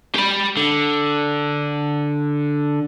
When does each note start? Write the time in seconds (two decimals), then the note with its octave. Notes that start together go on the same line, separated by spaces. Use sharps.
0.15 G4 B5
0.57 D3